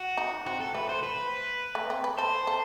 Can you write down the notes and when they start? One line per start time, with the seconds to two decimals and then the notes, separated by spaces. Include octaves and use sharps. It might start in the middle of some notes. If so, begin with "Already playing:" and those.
Already playing: F#4
0.18 D#4
0.46 C4 F#4
0.60 A4
0.74 A3 B4
0.89 C5
1.03 B4
1.75 A3
1.90 C4
2.04 B4
2.18 A4 C5
2.47 A4